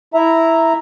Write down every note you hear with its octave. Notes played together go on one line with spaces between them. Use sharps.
E4 E5 A#5